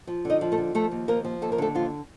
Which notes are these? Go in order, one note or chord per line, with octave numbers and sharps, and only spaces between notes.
F3
D3 D#4 D#5
F3
A3 A4
D3
F3 A3 A4
D#2
F3 A#3 A#4
F3
D#2 A4
A#4
D3 A3 A4
D#2 F3 F4